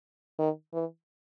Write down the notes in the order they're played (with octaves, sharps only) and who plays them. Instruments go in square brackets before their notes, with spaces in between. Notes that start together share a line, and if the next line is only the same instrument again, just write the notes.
[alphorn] D#3
E3